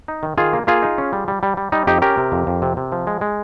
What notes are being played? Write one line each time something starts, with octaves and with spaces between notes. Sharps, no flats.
D#4
D#3
D#3 F4 G#4
A#3
A#3 F4 G#4
D#4
C#4
G3
G3
G3
G3
G3 D#4
F2 D#4 G4
C#4 G4 A#4
C3
F2
F2
C3
C3
F3
G#3
G#3